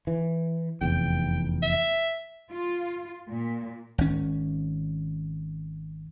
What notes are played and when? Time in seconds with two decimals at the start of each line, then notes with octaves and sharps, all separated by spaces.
0.07 E3
0.81 F1 E2 G5
1.62 E5
2.50 F4
3.29 A#2
3.98 G#1 C#4